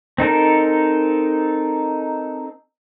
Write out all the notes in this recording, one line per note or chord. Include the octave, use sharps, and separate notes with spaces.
C4 D#4 A4 A#4